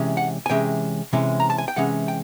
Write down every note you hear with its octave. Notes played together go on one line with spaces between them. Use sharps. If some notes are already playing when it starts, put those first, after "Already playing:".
Already playing: C3 E3 G#3 C#4
F#5
G#5
C3 E3 G#3 C#4 G5
C3 E3 G#3 C#4
A#5
A5
G#5
G5
C3 E3 G#3 C#4 F#5
G5